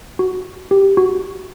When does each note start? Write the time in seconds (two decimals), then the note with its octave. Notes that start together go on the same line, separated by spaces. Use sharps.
0.19 F#4
0.71 G4
0.97 F#4